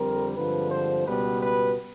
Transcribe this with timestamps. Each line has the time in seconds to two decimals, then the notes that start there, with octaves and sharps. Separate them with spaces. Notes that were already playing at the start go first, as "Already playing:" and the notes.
Already playing: F2 D3 G3 C4 A#4
0.36 G2 D3 F3 G#3 C4 B4
0.71 C5
1.06 C#2 B2 G3 B3 B4
1.42 B4